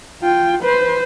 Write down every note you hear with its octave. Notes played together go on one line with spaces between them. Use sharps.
F4 G5
B4 C5